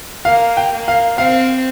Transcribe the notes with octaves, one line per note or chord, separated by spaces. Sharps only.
A#3 F5
G5
A#3
F5
C4 F5